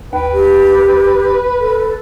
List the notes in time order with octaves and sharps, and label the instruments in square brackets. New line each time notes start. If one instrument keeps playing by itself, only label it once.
[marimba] D#2 [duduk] B4 [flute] G5
[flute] G4
A4